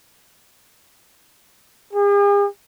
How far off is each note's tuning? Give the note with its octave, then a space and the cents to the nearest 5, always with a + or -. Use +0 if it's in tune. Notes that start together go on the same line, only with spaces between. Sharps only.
G#4 -45